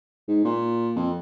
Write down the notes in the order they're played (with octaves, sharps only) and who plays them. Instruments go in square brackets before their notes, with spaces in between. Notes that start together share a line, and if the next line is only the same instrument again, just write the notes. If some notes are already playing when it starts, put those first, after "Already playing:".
[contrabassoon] G#2
A#2
F2